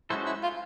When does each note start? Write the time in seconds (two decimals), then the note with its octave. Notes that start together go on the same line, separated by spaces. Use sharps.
0.10 G#3 C#4 E4 F#4 A4 C5
0.26 E4
0.43 F4